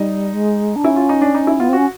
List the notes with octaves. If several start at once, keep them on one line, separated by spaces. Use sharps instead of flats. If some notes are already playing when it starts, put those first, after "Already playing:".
Already playing: G3 D#4
G#3
D4
C#4 E4
F4
D#4
D4
D#4
E4
B3 F4
C4
C#4 F#4